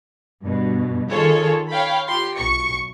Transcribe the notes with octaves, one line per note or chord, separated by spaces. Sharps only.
G2 B2
D#3 F4 G#4 A4 C#5
C#5 F5 G5 B5
F4 G4 C6
B1 C#6 C#7